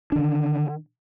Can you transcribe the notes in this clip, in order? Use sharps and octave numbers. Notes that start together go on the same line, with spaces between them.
D3 D#3 D4